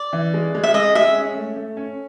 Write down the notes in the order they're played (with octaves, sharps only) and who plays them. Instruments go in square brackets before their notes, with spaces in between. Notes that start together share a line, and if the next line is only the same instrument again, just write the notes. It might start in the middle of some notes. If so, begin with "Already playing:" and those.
Already playing: [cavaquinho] D5
[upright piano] E3
G#3
G#3
[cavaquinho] E5
[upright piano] G#3 [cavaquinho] D#5
[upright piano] G#3 [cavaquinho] E5
[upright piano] C#4
A3
A3
C#4